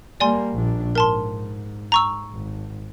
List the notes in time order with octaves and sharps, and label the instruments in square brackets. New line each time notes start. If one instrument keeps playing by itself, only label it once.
[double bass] G3 A#3 [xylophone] D5 G#5 C6
[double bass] A#1 D4
[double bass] G#2 [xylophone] A#4 A5 C6
[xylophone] A#5 C#6 E6
[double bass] G#1